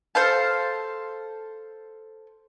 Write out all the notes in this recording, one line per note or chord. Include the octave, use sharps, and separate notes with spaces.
A4 C5 F5 A5